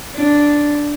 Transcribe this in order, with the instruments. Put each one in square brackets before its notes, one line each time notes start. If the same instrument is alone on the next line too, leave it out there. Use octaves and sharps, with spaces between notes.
[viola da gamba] D4